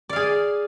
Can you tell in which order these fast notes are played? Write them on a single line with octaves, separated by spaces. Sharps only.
D5 F5 G#4